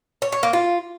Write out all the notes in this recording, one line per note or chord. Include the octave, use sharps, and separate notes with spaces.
C#5
C#5
A#3
F4